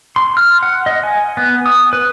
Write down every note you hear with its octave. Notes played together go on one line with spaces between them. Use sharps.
C6
F6
F#5
D#5
G#5
B3
D#6
B4